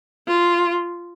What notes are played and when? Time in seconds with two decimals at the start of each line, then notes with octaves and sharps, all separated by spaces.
0.28 F4